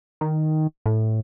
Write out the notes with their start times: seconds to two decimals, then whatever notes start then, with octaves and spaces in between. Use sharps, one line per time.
0.21 D#3
0.86 A2